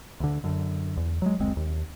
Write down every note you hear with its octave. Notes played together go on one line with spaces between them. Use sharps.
D2 D3
F#2 D3
E2
F#3 G#3
F#1 D2 G#3 C4
D#2